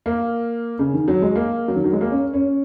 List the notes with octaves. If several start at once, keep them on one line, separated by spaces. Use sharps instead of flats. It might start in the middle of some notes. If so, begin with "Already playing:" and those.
A#3
C#3
D#3
F#3
G#3
A#3
F#3
D#3
F#3
G#3
A#3
C#4
C#4